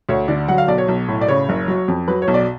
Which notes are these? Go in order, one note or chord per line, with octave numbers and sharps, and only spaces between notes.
D2 C#5
D3 D5
F#3 F#5
F5
B1 D5
C#5
B1
A2
D5
C#3 C#5
F#1
F#3
F2
F#3 B4
C#5
B1
D5